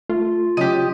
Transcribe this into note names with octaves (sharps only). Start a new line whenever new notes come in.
A3 F4
C#3 F#3 C#4 G4 D#5